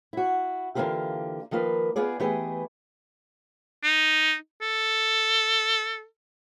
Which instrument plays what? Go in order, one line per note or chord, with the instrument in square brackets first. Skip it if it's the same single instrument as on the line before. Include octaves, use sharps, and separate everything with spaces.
[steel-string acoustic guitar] E4 F#4
D3 E3 A#3 C4 F4 G4
D#3 F3 A#3 F4 B4
B3 F4 G#4 D5
E3 A3 B3 G4 G#4 D#5
[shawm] D#4
A4